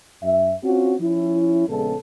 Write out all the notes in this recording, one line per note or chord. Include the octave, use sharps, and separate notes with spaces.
F#2 E5
C4 C#4 F4 F#4
F3 C#4 E4
A#1 C#3 G#3 B3 A4